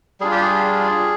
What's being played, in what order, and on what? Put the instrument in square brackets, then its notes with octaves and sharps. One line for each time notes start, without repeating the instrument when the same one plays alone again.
[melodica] G3 D4 F4 G#4
G4
G#4